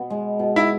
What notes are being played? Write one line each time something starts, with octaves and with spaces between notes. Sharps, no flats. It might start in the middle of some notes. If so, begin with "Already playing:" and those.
Already playing: B2 B3
G#3
B2
E4